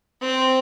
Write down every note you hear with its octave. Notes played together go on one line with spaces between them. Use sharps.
C4